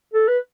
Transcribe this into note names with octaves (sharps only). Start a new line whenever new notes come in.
A4
B4